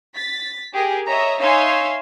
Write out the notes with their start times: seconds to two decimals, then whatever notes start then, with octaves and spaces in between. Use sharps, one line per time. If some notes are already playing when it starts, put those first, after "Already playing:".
0.14 A6 B6
0.73 G4 G#4 A#4
1.06 C#5 D#5 E5 A#5
1.40 D#4 C#5 E5 F5 G#5 C6